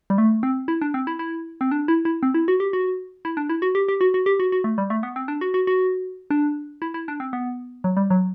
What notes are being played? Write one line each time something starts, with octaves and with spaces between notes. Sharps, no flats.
G3
A3
C4
E4
D4
C4
E4
E4
C4
D4
E4
E4
C4
E4
F#4
G4
F#4
E4
D4
E4
F#4
G4
G4
F#4
F#4
G4
F#4
F#4
A3
G3
A3
B3
C4
D4
F#4
F#4
F#4
D4
E4
E4
D4
C4
B3
F#3
G3
F#3